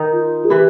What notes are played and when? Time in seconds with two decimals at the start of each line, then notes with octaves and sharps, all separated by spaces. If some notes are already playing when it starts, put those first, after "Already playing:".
Already playing: D#3 D#4
0.13 F4
0.45 G#4
0.50 E3 E4 G4